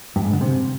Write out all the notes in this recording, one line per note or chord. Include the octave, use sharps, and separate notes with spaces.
G2
G#2
D3
C3